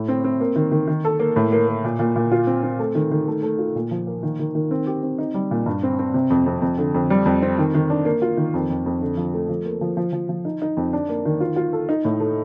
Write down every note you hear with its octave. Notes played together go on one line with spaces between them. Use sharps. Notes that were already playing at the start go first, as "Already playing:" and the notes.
Already playing: A2
C4
C4
A#3
D#3
D#3
D#3
A4
A#3
A2
A#3
A#3
A#2
A#2
A#2
F4
C4
C4
A3
D#3
D#3
A3
A3
F4
A#2
F3
A#3
D#3
D#3
D#3
C4
G4
C4
D#4
G3
A#2
G2
C4
C4
C3
F2
F2
F2
D3
F2
G3
F2
C4
D#3
D#3
D4
A#3
F4
D#3
F2
F2
F2
D3
F3
A3
F3
A#3
F3
F3
F3
F3
D#4
D#4
F2
D4
A#3
D#3
F4
F4
A4
D#4
A2
A3